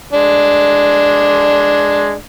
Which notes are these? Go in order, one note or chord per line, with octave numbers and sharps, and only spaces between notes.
G#3 D4